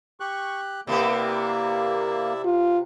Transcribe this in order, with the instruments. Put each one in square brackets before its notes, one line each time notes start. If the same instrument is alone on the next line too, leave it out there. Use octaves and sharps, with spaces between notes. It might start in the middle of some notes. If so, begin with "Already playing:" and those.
[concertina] G4 F#6 [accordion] C#6
[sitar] C3 B3 G4 [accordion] A#3 [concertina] E4 D5 E5
[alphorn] F4